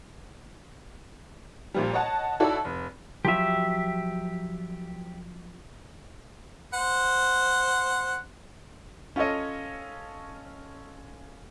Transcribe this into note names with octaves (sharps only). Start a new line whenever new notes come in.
A#2 F3 G3
C#5 D#5 F#5 A5
D#4 E4 F#4 A4 C#5 D5
F1
F3 F#3 F4 G4 E5
C5 F#5
C#4 F4 A4 C#5 D#5